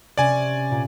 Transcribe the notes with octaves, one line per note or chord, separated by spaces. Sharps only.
C3 C#4 D5 G#5
A#2